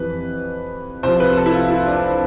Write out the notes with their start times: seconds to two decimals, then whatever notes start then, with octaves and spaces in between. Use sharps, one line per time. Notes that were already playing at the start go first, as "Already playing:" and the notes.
Already playing: F2 E3 G3 B4
1.03 C2 C3 F3 C5
1.20 B4
1.37 A4
1.46 E4
1.53 F4
1.70 E4
1.87 D4
2.04 C4